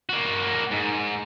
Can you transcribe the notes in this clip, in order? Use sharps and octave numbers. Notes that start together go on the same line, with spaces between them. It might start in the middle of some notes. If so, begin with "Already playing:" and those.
A#3 F#4
G#2